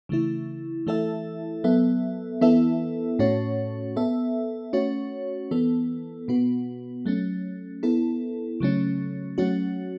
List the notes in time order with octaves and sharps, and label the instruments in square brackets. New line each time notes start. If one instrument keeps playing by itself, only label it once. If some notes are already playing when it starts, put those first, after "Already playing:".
[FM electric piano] C#3 E3 A3 E4
E3 A3 E4 A4 E5
F#3 B3 A4 E5
E3 B3 E4 A4 E5
A2 A3 C#4 F#4 C#5
B3 A4 E5
A3 C#4 F#4 C#5
E3 B3 A4
B2 B3 F#4
F#3 A3 C#4
B3 E4 A4
C#3 F#3 A3 C#4
F#3 A3 C#4 F#4